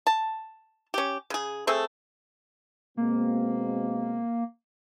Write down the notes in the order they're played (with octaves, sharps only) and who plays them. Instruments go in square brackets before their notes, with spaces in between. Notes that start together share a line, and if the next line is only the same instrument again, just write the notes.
[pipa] A5
C#4 G4
C#3 G#4
A3 C4 G#4 A4
[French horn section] B2 G#3 C4 [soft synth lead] A#3